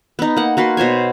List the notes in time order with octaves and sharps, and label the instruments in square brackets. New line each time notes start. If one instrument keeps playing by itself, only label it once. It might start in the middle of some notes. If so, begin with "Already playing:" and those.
[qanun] B3 D#4
A#3 F#5
A#3 F#4 B4 C6
B2 C5 C#5 G#5